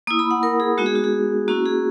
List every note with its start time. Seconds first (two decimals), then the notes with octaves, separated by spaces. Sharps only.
0.07 A#3 E4 D#6
0.19 B5
0.31 F#5
0.43 A#4
0.60 G#4
0.77 G#3 B3 D#4 F#4
0.86 G#4
0.96 F#4
1.04 G#4
1.48 A#3 C#4 E4 F#4
1.65 G#4